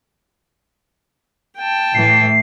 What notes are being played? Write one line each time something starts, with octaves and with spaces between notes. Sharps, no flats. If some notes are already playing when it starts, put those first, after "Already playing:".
G5 A5
A2 E3 A3 C7